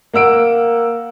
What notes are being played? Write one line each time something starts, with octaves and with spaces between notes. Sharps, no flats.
A#3 F#5 E6 D7